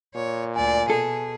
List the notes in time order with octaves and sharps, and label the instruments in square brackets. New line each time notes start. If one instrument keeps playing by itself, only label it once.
[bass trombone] A#2 [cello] C#5
[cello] D2 D5 [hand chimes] G#5
[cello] B2 G#4 [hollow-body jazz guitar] A4